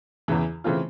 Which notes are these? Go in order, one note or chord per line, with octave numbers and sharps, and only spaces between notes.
E2 C#3 E3
C#3 E3 A3 C4 F4